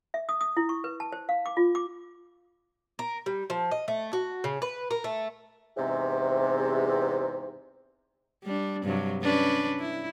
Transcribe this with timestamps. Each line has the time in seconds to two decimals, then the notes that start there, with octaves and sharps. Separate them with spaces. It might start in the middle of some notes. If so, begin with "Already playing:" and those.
0.14 E5
0.29 D#6
0.41 D#6
0.57 E4
0.69 C#6
0.84 B4
1.00 A5
1.12 C5
1.29 F5
1.46 D6
1.57 F4
1.75 D6
2.99 A#4
3.26 G3
3.50 F3
3.71 D#5
3.88 A3
4.13 F#4
4.44 C#3
4.62 B4
4.91 A#4
5.04 A3
5.77 E2 G#2 C3
8.44 G3 D4
8.84 G2 C3 F#3
9.23 C#4 D4 B4
9.79 E4